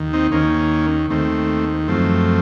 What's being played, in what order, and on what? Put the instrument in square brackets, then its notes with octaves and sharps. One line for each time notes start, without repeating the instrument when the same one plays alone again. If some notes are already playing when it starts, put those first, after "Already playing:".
Already playing: [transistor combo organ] D#2 D#3
C4 D#4
D#2 D#3 A#3 C#4
D#2 D#3 A3 C4
F#2 F3 A3 C4